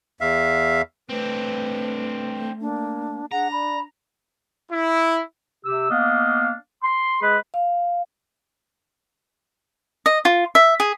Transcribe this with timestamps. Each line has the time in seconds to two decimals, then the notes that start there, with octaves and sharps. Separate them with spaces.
0.21 E2 E5 F5
1.09 A3 C4 D4 B4
2.61 A#3 D4
3.32 D4 G#4 F#5 A#5
3.52 D5 B5
4.70 E4
5.65 C3 G4 E6
5.90 A#3 B3 D4 D#5 F5
6.84 C6
7.22 G#3 G#4 B4
7.54 F5
10.06 D#5
10.25 F4
10.55 E5
10.80 G#4